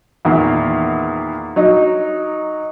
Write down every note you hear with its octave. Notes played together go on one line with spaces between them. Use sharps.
E2 A#2 D#3
F#3 D#4 D#5